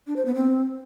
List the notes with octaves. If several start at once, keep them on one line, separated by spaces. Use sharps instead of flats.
D4
C5
B3
C4